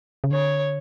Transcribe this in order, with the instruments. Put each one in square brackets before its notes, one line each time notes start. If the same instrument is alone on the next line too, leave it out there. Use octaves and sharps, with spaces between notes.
[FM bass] C#3
[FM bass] D3 [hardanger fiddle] C#5